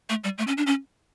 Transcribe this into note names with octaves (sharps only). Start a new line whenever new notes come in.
A3
G3
A3
C#4
D4
C#4